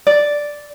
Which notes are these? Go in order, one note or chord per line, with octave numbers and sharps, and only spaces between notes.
D5